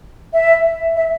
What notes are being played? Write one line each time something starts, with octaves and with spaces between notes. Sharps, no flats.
E5
E5